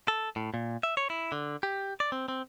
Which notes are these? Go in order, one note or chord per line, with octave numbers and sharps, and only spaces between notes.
A4
A2
A#2
E5
C#5
E4
D3
G4
D5
C4
C4